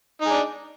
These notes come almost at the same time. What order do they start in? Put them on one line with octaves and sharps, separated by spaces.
D#4 G#4 D4